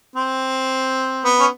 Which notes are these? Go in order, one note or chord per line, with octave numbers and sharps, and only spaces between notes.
C4
B3
C#4